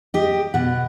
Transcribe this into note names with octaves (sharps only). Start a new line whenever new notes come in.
G4 D#5
B2 F#5